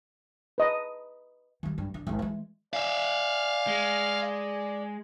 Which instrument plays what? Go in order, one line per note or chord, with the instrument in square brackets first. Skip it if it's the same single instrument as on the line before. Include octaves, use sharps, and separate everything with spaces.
[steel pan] B4 D#5
[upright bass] D#3 G3
G2
D3
G#1 D#3
E3 G#3
[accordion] D5 G#5 [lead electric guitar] E5 F5
[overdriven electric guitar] G#3